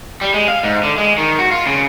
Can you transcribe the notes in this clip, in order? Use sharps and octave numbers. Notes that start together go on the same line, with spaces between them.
G3
G#3
F5
G#2
D3
G#3
D#3
F#4
F4
C#3